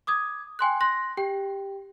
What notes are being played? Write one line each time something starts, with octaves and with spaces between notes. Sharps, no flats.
D6 D#6 G#6
G5 G#5 C6 F#6
C6 F#6 A#6
G4 G5